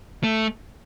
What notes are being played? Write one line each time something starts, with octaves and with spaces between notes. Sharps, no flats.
A3